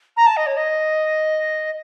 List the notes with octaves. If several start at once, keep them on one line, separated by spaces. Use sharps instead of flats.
A#5
A5
D#5
C#5
D#5